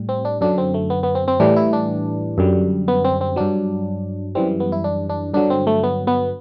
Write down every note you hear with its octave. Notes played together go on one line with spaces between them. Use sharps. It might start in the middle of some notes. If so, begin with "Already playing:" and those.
Already playing: A2 G3
C4
D4
F#2 D3 F#3 D4
C4
A3
B3
B3
C4
C4
A2 E3 G3 D4
E4
D4
F#2 D3 G3
B3
C4
C4
G2 F#3 D4
F#2 E3 G3 C4
B3
E4
D4
D4
G2 D3 F#3 D4
C4
A3
B3
B3